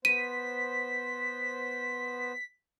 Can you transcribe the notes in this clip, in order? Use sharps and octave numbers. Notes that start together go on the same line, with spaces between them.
B3 C5 B6 D#7